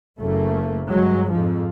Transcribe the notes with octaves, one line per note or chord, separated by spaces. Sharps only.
F#1 A3 A#3
G2 F#3 G#3
F2 G#2 F3